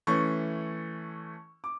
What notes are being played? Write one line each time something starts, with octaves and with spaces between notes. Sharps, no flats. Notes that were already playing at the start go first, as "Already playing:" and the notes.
E3 A3 C#4 C#6
D6